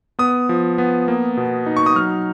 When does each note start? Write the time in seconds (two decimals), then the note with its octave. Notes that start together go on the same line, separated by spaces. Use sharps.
0.19 B3 D#6
0.49 F3
0.78 B3
1.08 A#3
1.37 B2
1.66 D#4
1.77 C#6
1.86 D#6
1.96 F#3 F6